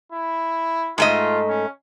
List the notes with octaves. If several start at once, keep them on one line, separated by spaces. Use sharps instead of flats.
E4
G#2 A3 F4 D#5
C#4